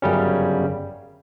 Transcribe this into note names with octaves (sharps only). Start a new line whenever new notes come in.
G1 F#2 C#3 G3 C#4